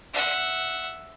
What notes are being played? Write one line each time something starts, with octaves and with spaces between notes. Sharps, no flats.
E5 F#5